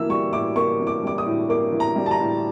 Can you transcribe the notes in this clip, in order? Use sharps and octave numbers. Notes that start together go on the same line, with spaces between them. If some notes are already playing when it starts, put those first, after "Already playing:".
Already playing: E3 A#3 E6
G3 C#6
A2 D6
A#3 C#6
E3
D6
G3 D6
D#6
A2
A#3 D6
E3
A#5
G3
A5
A#5
A2